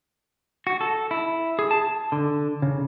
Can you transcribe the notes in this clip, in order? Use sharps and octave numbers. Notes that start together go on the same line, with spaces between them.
F#4
A4
E4
G#4
A5
D3
C#3